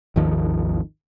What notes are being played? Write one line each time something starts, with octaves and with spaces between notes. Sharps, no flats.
G#1 D#2 D#3 F3